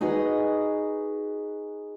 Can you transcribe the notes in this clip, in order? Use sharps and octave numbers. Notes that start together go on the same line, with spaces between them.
D#4 F#4 G#4 B4 D#5